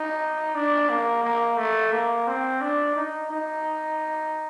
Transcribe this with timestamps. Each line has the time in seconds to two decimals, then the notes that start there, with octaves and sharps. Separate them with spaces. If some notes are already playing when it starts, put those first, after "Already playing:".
Already playing: D#4
0.55 D4
0.89 A#3
1.24 A#3
1.58 A3
1.92 A#3
2.27 C4
2.61 D4
2.96 D#4
3.31 D#4